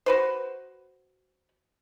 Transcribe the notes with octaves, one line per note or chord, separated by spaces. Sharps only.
F#4 B4 C5